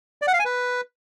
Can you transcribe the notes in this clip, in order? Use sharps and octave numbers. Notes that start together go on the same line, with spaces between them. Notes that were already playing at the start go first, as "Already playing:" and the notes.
D5
F#5
F5
G#5
B4